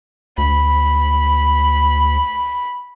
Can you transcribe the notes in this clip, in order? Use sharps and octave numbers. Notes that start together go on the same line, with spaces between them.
D2 B5